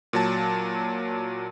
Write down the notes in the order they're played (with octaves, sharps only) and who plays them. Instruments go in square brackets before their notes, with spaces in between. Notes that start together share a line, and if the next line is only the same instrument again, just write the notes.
[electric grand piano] A#2 F#3 A5